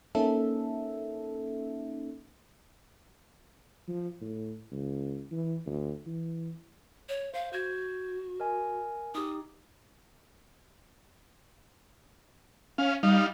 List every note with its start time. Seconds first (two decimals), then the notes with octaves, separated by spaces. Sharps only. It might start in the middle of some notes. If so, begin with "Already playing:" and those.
0.15 A#3 C#4 D#4 A4 E5
3.88 F3
4.21 A2
4.72 C#2
5.31 E3
5.66 D2
6.06 E3
7.09 C#5
7.34 C5 F5
7.53 F#4 G6 G#6
8.40 A#4 D#5 G#5
9.15 D#4 G4 D#6
12.78 C#4 F5
13.03 G3 D#4 F5